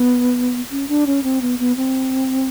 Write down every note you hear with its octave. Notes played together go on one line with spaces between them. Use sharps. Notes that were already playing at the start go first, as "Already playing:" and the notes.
Already playing: B3
C#4
D4
C#4
C4
B3
B3
C4